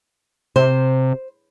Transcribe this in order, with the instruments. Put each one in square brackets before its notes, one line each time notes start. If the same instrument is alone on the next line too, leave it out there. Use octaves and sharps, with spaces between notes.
[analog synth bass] C3 [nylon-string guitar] C5